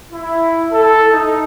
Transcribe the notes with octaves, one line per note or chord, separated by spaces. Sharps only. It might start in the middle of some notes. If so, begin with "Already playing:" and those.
E4
A4
D#4